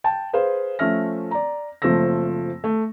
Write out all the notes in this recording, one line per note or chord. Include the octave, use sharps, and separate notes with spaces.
G5 A5
G#4 B4 C5 F5
F3 A3 C#4 E5 F6 A#6
D5 A#5
F#1 F3 A3 C4 E6 A#6
A3